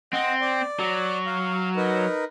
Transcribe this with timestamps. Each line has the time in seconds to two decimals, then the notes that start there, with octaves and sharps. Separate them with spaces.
0.13 C4 D#5 F#5
0.41 D5
0.79 F#3
1.26 F5
1.76 D#4 A#4 B4